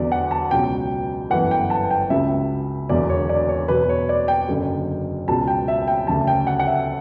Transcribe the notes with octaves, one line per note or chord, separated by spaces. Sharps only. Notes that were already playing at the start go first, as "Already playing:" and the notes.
Already playing: E2 D3 F#3 D5
F#5
A5
C#2 B2 F#3 G5
G1 F#2 E3 F#5
G5
A5
G5
C#2 C#3 F#3 E5
E1 E2 D3 F#3 D5
C#5
D5
C#5
E2 B2 F#3 B4
C#5
D5
G5
F#1 F#2 D3 F#3
C#2 B2 F#3 A5
G5
E5
G5
D2 C#3 F#3 A5
G5
F#5
F#5
E5